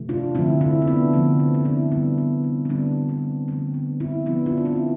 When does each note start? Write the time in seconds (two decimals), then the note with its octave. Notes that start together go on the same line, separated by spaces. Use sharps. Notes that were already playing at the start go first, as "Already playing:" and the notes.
Already playing: C3 E3 A3
0.09 D4 F4
0.35 D3 F3 A3 C4 E4
0.61 C4 E4
0.82 C4
0.87 B3 D4
1.13 D3 F3 A3 C4
1.40 C4
1.54 D4
1.65 C4 E4
1.92 D3 G3 B3 D4
2.18 B3
2.44 C4
2.65 C4
2.69 D3 G3 B3 D4
3.09 C4
3.48 D3 F3 A3 C4
3.74 B3 D4
4.00 C4 E4
4.26 D3 F3 A3 B3 D4
4.46 D4 F4
4.58 F4
4.65 C4 E4
4.76 E4